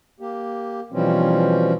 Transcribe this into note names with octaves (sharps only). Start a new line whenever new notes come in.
A#3 G4
B2 E3 F3 G3 C4 C#4